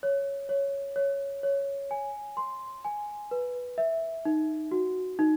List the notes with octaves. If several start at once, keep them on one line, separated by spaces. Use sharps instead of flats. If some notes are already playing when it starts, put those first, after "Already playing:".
C#5
C#5
C#5
C#5
G#5
C6
G#5
B4
E5
D#4
F#4
D#4